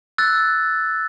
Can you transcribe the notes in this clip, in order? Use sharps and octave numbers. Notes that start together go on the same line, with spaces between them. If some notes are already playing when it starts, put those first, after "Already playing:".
E6 F#6 A6